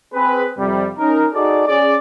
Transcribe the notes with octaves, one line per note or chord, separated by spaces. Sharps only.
C4 G#4 B4
F2 C3 G3
C#4 D#4 A#4
D#4 F#4 G#4 A4 D5
C#4 G#4 D5